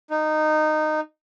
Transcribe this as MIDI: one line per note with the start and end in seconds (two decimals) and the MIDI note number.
0.10 1.00 63